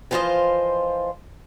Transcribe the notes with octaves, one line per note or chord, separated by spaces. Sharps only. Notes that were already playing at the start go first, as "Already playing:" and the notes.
E3 F3 F4 B4 C5 D#5